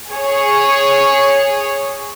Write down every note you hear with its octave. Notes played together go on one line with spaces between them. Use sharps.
G#4 C#5